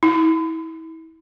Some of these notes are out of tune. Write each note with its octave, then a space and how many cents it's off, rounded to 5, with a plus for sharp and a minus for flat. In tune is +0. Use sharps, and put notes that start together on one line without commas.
E4 -35